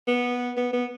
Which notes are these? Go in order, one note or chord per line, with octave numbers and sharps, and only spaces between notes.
B3
B3
B3